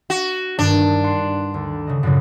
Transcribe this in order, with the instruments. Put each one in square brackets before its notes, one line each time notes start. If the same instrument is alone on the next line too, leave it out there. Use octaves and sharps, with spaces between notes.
[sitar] F#4
[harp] G2 D#3 [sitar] D4
[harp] F#5 C6
D2
C#3 D#5
F#2 A2 C#3